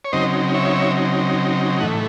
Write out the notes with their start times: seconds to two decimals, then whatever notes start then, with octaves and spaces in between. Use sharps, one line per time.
0.05 C#5
0.12 C#3 F#3 C4 D#4 C5 D#5
0.54 C#5 E5
1.80 A2 E3 A3 D#5 F#5